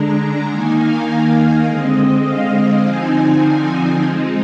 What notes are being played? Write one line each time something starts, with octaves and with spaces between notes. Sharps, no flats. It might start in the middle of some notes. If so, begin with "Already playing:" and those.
Already playing: D3 G#3 D4 A#5
D#3 A#3 D#4 G#5
F5
F5
D3 G#3 C4 D#5
F5
D3 F3 C4 D#4 G#5
F3 G#3 C4 D#4